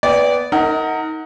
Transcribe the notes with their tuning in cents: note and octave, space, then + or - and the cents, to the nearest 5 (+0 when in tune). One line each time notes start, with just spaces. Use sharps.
B3 +0 D5 -20 G5 +25
D#4 +30 A#4 -25 F#5 +0